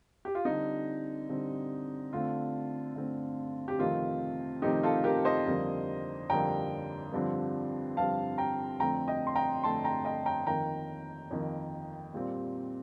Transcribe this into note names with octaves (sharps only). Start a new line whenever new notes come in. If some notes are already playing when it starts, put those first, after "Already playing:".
G4
F4
D3 G3 C4 D#4
D3 G3 C4
D3 A3 C4 F4
D3 A3 C4
G4
F2 C3 D#3 A3 C4 F4
F2 C3 D#3 A3 C4 D#4 G4
F4 A4
G4 A#4
C5 D#5
F2 D3 G3 A#3
F2 D3 G3 A#3 G5 A#5
G2 D3 F3 C4
G2 D3 F3 C4 F5 A5
G5 A#5
F2 D3 A3 C4 G5 A#5
D#5 G5
C6
G5 A#5
F2 D3 A3 C4 A5 C6
G5 A#5
D#5 G5
G5 A#5
F2 D#3 A#3 G5 A#5
F2 D#3 A#3
A#2 G3 C4